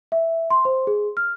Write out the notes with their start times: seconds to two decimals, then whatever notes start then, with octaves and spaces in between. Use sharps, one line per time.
0.12 E5
0.50 C6
0.65 C5
0.87 G#4
1.17 F6